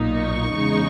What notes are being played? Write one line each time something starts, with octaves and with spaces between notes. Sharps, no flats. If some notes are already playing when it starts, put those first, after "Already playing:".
Already playing: B1 A#2 A#3 D#4
C#6
E2 C#3 G#3 D#4